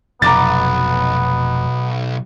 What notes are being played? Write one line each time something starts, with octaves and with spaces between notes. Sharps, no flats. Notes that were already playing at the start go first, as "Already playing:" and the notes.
F1 B1 B3 A#5 D6 A6